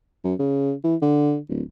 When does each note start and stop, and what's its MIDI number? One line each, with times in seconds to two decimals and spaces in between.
0.24 0.34 42
0.39 0.73 49
0.84 0.96 52
1.02 1.38 50
1.49 1.62 26